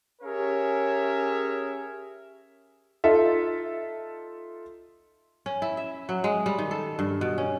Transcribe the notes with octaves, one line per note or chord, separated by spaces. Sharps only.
C#4 G4 G#4 A#4 C#5 E5
D#4 F4 A4 E5
C#4
E4
E5
F#3
G#3
G3
D#3
A4
G2
B2
C#4